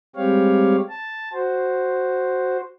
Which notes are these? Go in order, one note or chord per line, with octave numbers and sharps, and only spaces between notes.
G3 G#3 C4 G4 C#5 F5
A5
F#4 C5